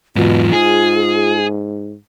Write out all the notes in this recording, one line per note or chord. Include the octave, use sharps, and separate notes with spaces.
E2 G#2 B2 F4
G#2 G#4